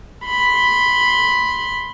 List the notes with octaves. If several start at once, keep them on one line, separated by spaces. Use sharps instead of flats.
B5 C6